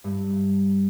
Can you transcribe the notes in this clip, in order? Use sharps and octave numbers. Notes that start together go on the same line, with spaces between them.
G2